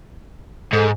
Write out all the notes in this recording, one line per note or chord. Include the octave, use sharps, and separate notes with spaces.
G#2 A4